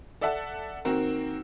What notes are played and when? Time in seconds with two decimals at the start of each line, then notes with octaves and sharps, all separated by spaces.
0.21 A4 D5 E5 F#5 A5
0.85 D#3 A#3 C4 F#4 A#4